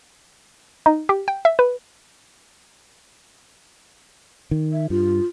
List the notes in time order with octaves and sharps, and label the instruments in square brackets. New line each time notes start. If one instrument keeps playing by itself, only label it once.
[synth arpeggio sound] D#4
G4
G5
E5
B4
[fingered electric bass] D#3
[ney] E5
[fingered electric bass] G2 [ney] F4